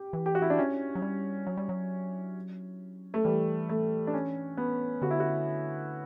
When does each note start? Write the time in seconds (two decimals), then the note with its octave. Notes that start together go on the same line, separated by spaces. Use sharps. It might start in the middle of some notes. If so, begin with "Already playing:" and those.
Already playing: G4
0.13 E3
0.26 G4
0.35 F#4
0.42 E4
0.50 D4
0.58 C#4
0.95 F#3
1.02 G3
1.47 F#3
1.57 G3
1.69 F#3
3.14 A3
3.24 E3 G3
3.69 A3
4.07 D4
4.14 C#4
4.57 B3
5.02 D3 F#4
5.11 E4
5.20 F#4